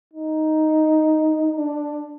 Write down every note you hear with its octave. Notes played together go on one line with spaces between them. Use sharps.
D#4
D4